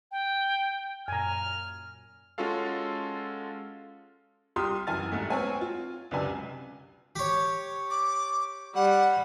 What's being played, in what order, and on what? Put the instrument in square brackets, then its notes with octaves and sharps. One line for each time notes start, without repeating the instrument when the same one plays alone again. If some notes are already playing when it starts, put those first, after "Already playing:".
[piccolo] G5
[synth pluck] F#2 A#2 [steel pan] G#5 A#5 [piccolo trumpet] F6
[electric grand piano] G#3 C#4 F4 F#4 A4 F5
[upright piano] C2 F4 G4 C6 D#6 F6
F#2 E3 E4 G#5 F6 A6
C2 G#2 A3
B3 C4 C#5 G#5
F4
C#2 F#2 C3 D4 B4 G#5
[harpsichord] G4 C#5
[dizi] D6
[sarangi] G3 [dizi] F#5